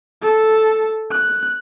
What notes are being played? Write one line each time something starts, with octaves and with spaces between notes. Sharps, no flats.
A4
F#6